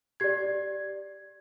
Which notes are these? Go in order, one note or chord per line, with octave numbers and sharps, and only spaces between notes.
G4 D5 G#6